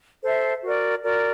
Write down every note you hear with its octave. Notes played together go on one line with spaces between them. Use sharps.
A4 C5 E5
F#4 A#4 D5
F#4 A#4 D5